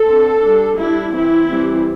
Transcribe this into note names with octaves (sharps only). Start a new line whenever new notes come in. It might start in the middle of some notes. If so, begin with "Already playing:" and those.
Already playing: A4
D3 C4
G3 D4
G3 D4 E4
E3 C4 E4
E3 G3 C4